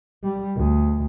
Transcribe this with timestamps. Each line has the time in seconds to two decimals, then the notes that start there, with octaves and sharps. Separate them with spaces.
0.23 G3
0.57 D2